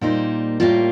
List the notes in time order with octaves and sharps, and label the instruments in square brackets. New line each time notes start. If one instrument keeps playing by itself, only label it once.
[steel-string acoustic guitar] A#2 G3 A#3 D#4 C5
A2 G3 A#3 F4